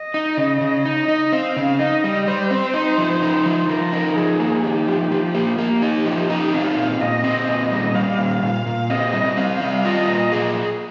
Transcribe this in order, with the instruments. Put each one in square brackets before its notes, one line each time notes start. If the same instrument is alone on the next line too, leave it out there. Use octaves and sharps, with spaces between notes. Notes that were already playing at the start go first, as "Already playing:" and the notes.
Already playing: [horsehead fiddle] D#5
[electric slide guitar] D#4
C#3
C#3
[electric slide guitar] D#4 [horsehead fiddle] D#5
[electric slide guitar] D#4
[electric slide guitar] C4 [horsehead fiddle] F5
[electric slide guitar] C#3
[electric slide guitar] D#4 [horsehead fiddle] D#5
[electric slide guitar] G3
[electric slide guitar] G3 [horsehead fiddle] C5
[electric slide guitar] C4
D#4
F3
D#4
F3
[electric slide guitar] F3 [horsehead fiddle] A#4
[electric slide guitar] D#4
[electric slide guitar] F3 [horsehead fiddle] G#4
[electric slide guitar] A#3
[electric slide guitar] D#4 [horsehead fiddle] G4
[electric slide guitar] F3
F3
A#3
[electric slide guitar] A#3 [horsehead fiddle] G4
[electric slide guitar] D#4
F3
D#4
[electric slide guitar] C4 [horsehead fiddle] F5
[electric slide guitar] A#2
[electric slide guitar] A#2 [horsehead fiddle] D#5
[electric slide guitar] C4
[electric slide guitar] A#2 [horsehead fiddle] D#5
[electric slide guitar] G3
[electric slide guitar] G3 [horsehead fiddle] F5
[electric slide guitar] A#2
[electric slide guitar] A#2 [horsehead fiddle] F5
[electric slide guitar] A#2
[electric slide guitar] C4 [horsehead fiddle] D#5
[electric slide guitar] G3
[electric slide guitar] C4 [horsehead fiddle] F5
[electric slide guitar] G3
[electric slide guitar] F4 [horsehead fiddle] D#5
[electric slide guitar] A#2
G#4